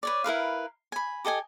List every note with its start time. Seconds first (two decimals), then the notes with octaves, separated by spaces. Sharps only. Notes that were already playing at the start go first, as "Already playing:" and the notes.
0.03 B4 C#5 D5
0.24 E4 A#4 B4 F5
0.92 G#5 B5
1.25 G4 A4 D#5 G#5